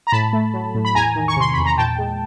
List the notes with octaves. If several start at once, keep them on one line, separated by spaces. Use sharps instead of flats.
A#5
A2 A5 B5
A3
F#3
A2
B5
E2 G#5 A#5
D#3
C#6
C3 C6
E2 B5
A#5
A#2 G5 A5
G#3